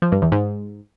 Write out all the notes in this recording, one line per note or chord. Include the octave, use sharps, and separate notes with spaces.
F3
G2
E2
G#2